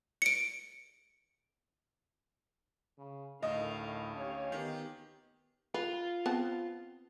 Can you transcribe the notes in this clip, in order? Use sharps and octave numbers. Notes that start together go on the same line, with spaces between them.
C#7 D7
C#3
D2 A2 D#3 D#4 D#5 F5
C#4 G4 C#5 F5
D#3 B3 G4
F4 B4
B3 C4 A5